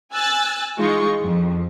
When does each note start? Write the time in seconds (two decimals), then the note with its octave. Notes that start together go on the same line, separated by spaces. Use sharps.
0.12 G#5 E6 F#6 A6
0.78 E3 G#3 D#4 F4 C#6
1.23 F2